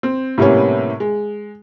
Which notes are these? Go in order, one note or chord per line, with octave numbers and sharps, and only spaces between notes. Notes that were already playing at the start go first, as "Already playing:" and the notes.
C4
A2 C3 G3 A#3 B3 C#4
G#3